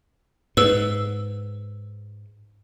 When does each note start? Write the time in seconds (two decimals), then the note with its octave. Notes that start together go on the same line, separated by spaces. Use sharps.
0.57 G#2 B4 E6